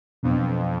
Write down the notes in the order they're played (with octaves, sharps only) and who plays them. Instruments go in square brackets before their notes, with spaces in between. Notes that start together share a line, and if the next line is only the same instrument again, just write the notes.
[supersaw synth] F2 [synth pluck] B2 F#3 B3 D4